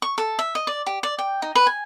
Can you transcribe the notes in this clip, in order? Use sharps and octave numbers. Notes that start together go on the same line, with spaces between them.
C#6
A4
E5
D#5
D5
G4
D5
G5
D#4
B4
G#5